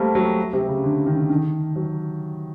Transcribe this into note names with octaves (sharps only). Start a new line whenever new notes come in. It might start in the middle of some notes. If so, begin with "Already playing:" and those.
Already playing: G3 A3 A#3 C4
F#3
C3
C#3
D3
D#3
D#3
F#3